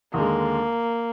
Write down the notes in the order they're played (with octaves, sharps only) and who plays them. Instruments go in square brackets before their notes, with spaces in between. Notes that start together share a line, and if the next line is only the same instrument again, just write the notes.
[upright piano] D#2 D3 G#3 [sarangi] A#3